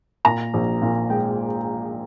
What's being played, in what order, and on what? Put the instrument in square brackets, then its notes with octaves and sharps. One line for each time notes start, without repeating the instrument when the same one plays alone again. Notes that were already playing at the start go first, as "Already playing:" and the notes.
[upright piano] A#2 A#5
A#1
A#2
G#3 G5